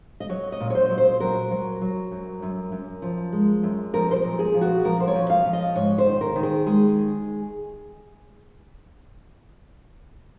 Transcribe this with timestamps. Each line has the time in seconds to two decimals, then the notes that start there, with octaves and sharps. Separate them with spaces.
0.20 D#5
0.29 F#3 C#5
0.52 D#5
0.60 A#2
0.70 C#5
0.75 C5
0.90 F#3
0.98 C5
1.20 F#3 A#4
1.51 F#3
1.81 F#3
2.11 F#2
2.42 F#2
2.72 F#2
3.02 F3
3.33 G#3
3.63 F#2
3.93 F3 A#4
4.11 C5
4.16 A#4
4.24 A#2
4.39 G#4
4.54 F3
4.61 F#4
4.85 F3 A#4
5.00 C5
5.08 C#5
5.14 F3
5.30 F5
5.46 F3
5.53 D#5
5.75 G#2 C#5
5.98 C5
6.06 D#3
6.21 A#4
6.36 D#3
6.43 G#4
6.66 G#3 G#4